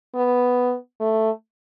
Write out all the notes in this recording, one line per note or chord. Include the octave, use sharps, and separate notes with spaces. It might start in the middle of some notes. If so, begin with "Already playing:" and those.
B3
A3